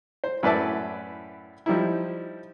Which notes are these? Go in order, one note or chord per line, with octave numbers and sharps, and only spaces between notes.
C5
F#2 A2 B4 D5 E5 A5
F3 G3 D#4 E4